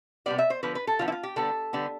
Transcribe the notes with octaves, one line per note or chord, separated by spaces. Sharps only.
C3 G3 B3 D5
E5
C5
D3 F3 B3 B4
B4
A4
D3 F3 B3 F4
E4
F4
G4
D3 G3 B3 A4
D3 G3 B3